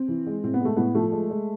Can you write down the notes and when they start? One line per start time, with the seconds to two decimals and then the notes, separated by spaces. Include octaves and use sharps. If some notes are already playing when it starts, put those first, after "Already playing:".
Already playing: C4
0.08 E3
0.27 G#3
0.43 A2 C4
0.54 B3
0.61 G#3 A3
0.77 A2 B3
0.95 F3 A3
1.12 G#3
1.30 G#3